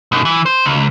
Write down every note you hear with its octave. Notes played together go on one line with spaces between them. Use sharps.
B1 F#2
E3
C5
C#2